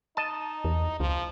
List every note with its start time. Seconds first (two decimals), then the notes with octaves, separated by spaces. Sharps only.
0.17 D#4 D#5 A5
0.65 E2
1.00 C#2 F3